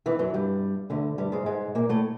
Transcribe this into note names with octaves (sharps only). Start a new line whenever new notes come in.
E2 E3
F#2 F#3
G2 G3
D2 D3
G2 G3
G#2 G#3
G#2 G#3
A#2 A#3
A2 A3